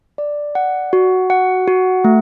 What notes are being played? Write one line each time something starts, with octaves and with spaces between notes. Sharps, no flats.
D5
F#5
F#4
F#5
F#4
A3